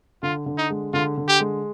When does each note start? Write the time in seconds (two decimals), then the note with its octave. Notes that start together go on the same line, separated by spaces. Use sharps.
0.23 D3 F4
0.46 D3
0.58 D#4
0.70 G#3
0.93 D3 F4
1.17 D3
1.28 G4
1.40 G#3